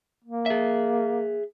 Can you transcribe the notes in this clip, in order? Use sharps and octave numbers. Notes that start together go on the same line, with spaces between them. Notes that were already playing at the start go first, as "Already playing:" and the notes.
A#3
G#4 E5